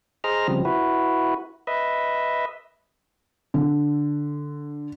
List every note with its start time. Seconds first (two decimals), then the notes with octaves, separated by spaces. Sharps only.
0.24 G#4 C5 D#5 A#5 F6
0.48 C#3 F3 G3 C4
0.65 E4 F#4 B4
1.67 B4 D#5 E5
3.54 D3